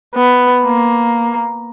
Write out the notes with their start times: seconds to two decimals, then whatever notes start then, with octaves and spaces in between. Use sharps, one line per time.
0.15 B3
0.65 A#3